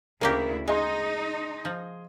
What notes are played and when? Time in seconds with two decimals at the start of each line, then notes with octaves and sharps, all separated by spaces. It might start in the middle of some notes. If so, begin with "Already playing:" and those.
0.21 D2 C#3 A#3 E4 G4 A#4
0.68 G#3 D#4 G#4 D#5 C6
1.65 F3